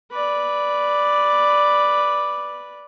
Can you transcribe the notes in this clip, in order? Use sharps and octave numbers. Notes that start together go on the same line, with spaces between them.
B4 D5